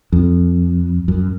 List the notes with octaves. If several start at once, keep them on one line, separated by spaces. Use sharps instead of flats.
F2
F#2